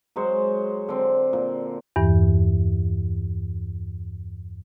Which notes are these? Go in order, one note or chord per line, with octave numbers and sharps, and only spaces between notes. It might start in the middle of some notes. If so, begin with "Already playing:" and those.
F#3 G#3 C5 C#5
D3 C4
A#2
E2 G2 E3